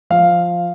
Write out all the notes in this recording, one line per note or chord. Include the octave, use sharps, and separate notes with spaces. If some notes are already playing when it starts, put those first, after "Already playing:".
F3 F5